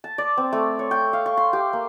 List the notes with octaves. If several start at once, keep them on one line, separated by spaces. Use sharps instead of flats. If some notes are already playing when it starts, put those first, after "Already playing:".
A5
D5
C4
A3
C#5
G5
F5
C#6
C6
G4
A#3